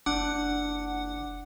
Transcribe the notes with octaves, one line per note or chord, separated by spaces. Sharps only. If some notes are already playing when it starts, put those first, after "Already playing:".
F#1 D4 F#5 D6 F#6